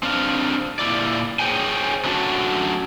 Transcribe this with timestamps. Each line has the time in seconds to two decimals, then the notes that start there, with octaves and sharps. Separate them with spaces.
0.03 C4 D4 F5
0.79 A#2 E4 D5
1.39 G#4 C5 C#5 G5 G#5
2.04 F#3 A3 C#4 D4 F#4